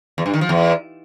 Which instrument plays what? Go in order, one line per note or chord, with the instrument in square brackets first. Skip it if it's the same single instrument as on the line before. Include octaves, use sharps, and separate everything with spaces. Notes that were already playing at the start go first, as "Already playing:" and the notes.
[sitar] E2
G2
D#3
F3
E2